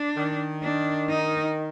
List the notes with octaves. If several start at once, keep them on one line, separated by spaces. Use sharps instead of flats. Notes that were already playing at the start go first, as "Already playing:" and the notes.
Already playing: D4
D#3
D4
D#4